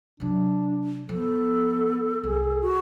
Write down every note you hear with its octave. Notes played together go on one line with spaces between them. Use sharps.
C3 F#3 D4
F3 B3 A4
C2 G#4
F#4